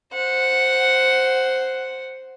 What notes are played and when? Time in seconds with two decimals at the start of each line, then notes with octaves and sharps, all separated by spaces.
0.13 C5 F#5